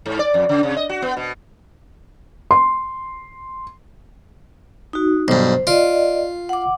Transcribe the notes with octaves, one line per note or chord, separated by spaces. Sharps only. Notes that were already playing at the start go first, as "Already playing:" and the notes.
G#2
D5
F2
C#3
C3
D#5
F#4
B3
B2
C6
D#4 F#4
B1 G2 C5
F4 D5 D#5
F#5 D6